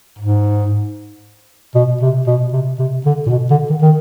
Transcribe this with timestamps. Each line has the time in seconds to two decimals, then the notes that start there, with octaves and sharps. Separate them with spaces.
0.19 G#2
1.75 B2
2.02 C3
2.27 B2
2.53 C3
2.79 C3
3.06 D3
3.27 A#2
3.31 B2
3.51 D3
3.70 D#3
3.81 D#3